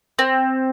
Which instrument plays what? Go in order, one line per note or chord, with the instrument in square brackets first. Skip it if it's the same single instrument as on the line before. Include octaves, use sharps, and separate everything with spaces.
[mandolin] C4